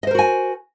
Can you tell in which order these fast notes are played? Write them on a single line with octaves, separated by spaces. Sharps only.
D#5 C5 A#4 F#4 G#5